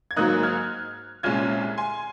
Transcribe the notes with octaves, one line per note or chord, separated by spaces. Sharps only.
G#6
G#2 F#3 A#3 D#4 D#6 F#6
F6 G#6
C2 A#2 G#3 C#4 F6 G#6
G#5 C6